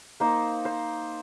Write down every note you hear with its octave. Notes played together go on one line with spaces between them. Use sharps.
A#3 D#4 C5
C5